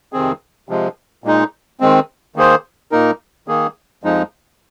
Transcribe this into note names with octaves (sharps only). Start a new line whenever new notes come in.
F2 C3 D#3 C4 G#4
C3 F3 G#3
A#2 G#3 D#4
D#3 G#3 C4
D#3 A#3 G#4 C5
A#2 A#3 D#4 A#4
D#3 A#3 G#4
F2 F3 G#3 D#4